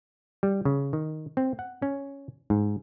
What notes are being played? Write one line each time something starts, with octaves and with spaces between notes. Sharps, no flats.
G3
C#3
D#3
C4
F#5
C#4
G#2